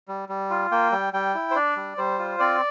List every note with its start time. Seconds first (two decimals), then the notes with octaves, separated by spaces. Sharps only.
0.08 G3
0.29 G3
0.50 F4
0.71 A#3 G5
0.92 G3
1.13 G3 G5
1.35 E4
1.51 C5
1.55 D4 D5
1.76 G3
1.97 G3 C5
2.19 F4
2.39 C4 D5